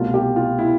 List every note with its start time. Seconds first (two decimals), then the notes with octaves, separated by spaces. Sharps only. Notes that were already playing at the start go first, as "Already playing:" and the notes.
Already playing: C2 B2 A3 F4
0.14 G4
0.36 F4
0.59 E4